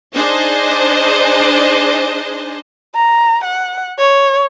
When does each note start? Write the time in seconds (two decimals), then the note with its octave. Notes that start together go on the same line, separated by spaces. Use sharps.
0.15 D4 D#4 G#4 C5 D#5
2.95 A#5
3.44 F#5
3.98 C#5